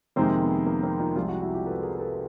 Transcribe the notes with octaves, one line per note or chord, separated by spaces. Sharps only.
F2 C3 D#3 G#3 A#3 C4
B3
A#3
A#3 C4
D#4 F4
C2 C3 F3 G#3 F4 G4
E4 F#4
E4 F#4
F4 G4
A4 B4
G#4 A#4
A4 B4